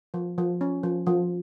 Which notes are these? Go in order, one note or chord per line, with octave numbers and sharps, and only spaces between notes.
F3
F3
C#4
F3
F3